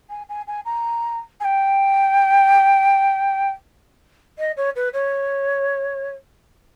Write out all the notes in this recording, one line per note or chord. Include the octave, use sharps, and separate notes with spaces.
G#5
G#5
G#5
A#5
G#5
G5
D#5
C#5
B4
C#5